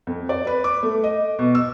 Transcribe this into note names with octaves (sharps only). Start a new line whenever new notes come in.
F2
D5
B4
D6
A3
D#5
B2
E6